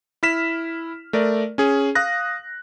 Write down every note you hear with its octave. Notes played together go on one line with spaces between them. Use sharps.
E4 F6 B6 E7
A3 A#4 D5
C#4 G#4
F5 D#6 F#6 A#6